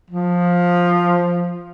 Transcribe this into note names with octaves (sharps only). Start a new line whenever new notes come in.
F3